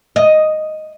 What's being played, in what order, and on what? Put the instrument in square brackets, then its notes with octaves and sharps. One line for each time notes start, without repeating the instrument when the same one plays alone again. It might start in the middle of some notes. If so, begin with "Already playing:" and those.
[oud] D#5